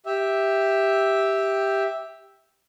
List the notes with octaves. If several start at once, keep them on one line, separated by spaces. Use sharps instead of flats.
G4 E5